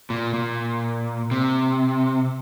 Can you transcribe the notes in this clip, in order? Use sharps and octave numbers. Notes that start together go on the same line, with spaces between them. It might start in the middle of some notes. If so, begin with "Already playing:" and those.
A#2
A#2
C3